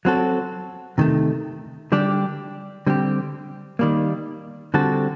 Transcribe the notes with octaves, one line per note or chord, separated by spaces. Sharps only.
F#3 C4 F#4 A4
C3 D#3 A3
D3 G3 D4 G4
D3 G3 C4 G4
D#3 G3 A#3
D3 G3 C4 F#4 A4